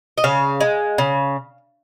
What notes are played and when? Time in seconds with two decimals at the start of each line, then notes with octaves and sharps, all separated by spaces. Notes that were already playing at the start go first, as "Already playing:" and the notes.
0.17 D#5
0.24 C#3 F5
0.61 G#3
0.98 C#3